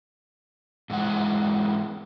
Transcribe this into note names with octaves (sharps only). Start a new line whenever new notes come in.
G#2 E3 G#3 F#5